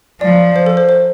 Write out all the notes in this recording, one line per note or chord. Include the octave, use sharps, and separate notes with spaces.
F3 D5
C5
A4
C5
C5